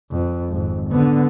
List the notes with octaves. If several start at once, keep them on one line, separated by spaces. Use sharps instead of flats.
F2
G#1 F2
D3 B3